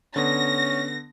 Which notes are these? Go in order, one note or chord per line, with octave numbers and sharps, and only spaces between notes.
D3 B3 C#4 A#6